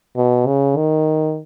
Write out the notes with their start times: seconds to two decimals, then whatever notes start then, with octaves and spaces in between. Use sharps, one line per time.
0.17 B2
0.47 C#3
0.76 D#3